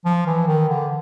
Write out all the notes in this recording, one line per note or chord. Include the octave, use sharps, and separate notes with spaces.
F3
E3
D#3
D3